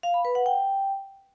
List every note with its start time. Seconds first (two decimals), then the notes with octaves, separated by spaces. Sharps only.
0.03 F5
0.14 B5
0.25 B4
0.35 F#5
0.46 G5